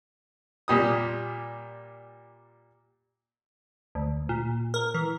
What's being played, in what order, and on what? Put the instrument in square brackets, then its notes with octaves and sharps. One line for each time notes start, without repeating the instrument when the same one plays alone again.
[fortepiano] A#2 G3 D#6
[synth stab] D2
A#2
A#4
E3